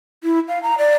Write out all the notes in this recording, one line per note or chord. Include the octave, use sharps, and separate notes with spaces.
E4
F5
A#5
D5